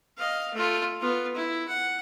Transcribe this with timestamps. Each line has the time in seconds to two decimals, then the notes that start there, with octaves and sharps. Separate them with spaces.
0.17 D#5 F5
0.54 A3 F4
1.00 B3 F4
1.35 E4
1.68 F#5